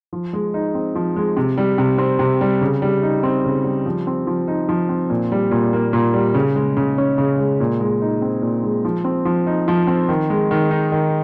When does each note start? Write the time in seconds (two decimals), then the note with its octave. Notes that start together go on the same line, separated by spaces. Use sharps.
0.13 F3
0.33 G#3
0.54 D#4
0.75 C4
0.95 F3
1.16 G#3
1.37 C3
1.58 G3
1.78 C3
1.98 C4
2.19 C3
2.41 G3
2.61 C#3
2.82 G3
3.03 D#4
3.23 C4
3.45 C#3
3.64 G3
3.86 F3
4.07 C4
4.27 F3
4.48 D#4
4.69 F3
4.89 C4
5.10 A#2
5.32 G3
5.51 A#2
5.73 A#3
5.93 A#2
6.14 G3
6.34 C#3
6.56 G#3
6.77 C#3
6.98 C#4
7.18 C#3
7.38 G#3
7.60 A#2
7.80 G#3
8.02 D#4
8.22 C4
8.42 A#2
8.63 G#3
8.85 F3
9.05 C4
9.25 F3
9.47 D#4
9.68 F3
9.87 C4
10.09 D#3
10.30 G#3
10.51 D#3
10.71 D#4
10.92 D#3